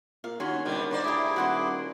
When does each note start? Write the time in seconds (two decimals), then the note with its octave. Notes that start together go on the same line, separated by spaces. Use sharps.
0.24 A#2 F5
0.40 D#2 C#4 F#4 G#4 C#5 C6
0.65 B2 D3 D#3 G3
0.91 A#3 C5 D5
1.04 A2 E4 G4 G#4 E5 D6
1.36 D#1 F#4 F#5 C6